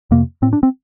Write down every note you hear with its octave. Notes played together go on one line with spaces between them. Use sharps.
F2 C3 A#3
A2 C4
D4
C4